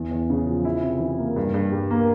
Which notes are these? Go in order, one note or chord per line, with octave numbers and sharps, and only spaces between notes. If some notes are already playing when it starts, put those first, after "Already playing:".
Already playing: E2
E2
C#3
F3
E4
C3
E3
A#3
G2
G2
G3
A#3